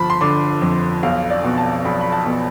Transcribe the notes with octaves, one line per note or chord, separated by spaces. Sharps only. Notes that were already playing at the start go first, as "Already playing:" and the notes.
Already playing: G1 F3 A5 B5
C6
D3 D6
F2
B1 F5
D5
B2
A5
B1 B5
B5
A5
B2